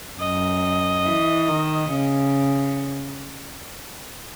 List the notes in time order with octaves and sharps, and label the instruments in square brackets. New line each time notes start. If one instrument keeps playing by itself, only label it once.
[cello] F#2 [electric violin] D#5
[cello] E3
D#3
C#3